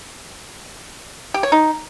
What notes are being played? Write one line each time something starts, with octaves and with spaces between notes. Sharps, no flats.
G4
C#5
D#4